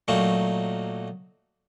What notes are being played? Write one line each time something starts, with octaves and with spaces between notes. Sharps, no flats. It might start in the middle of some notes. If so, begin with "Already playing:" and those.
A#2 F#3 A3 A#3 D#4 F#4